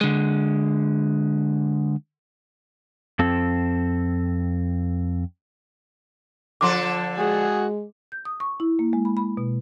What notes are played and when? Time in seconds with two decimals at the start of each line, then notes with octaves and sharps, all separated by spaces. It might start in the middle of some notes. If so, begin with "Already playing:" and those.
0.01 D3 G#3
3.19 F2 C4 A4
6.61 D3 F3 A4 C6 D6
7.19 G#3 F#4 G#4
8.12 G6
8.25 D#6
8.40 C#6
8.60 E4
8.79 A#3
8.93 G#3
9.05 B5
9.17 B5
9.37 B2